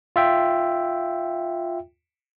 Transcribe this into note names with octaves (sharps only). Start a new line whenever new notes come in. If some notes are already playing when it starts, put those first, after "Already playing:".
F4 E5 G5